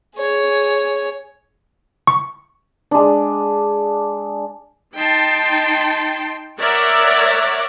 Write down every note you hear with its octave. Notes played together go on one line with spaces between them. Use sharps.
G#4 C#5
C#6
G#3 D4
D#4 G5 A5 C6
A#4 C#5 D5 E5 F#5